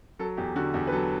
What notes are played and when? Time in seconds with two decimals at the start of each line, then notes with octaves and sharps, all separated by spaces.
0.19 F#3 A4
0.37 E2 G4
0.55 D3 F#4
0.74 E2 G4
0.87 B4
0.92 F#3 A4